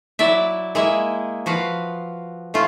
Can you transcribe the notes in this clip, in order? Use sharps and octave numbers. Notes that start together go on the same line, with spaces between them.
F#3 E4 D5 E5
G#3 A#3 E4 D#5 E5
F3 F#4 B4 F5
A3 C#4 F4